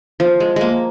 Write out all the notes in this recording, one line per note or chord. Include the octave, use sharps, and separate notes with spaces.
F3
G#3
G#3 A#3